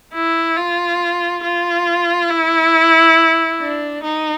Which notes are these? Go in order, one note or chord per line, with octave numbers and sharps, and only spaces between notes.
E4
F4
F4
E4
D4
D#4